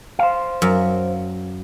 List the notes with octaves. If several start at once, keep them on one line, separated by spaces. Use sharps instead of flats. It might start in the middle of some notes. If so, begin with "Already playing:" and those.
C5 F5
F#2